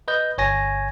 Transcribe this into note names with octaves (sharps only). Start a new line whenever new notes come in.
B4 D#5 G6
G1 C#5 G#5 A#6